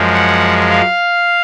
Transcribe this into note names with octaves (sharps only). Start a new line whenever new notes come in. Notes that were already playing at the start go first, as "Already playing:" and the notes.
Already playing: F#2 F3 G#3
F#5
F5